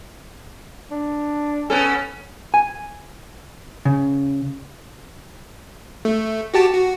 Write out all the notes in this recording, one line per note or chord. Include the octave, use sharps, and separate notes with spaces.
D4
B3 C#4 A4 G#5
G#5
C#3
A3
F#4 G4 A5
F#4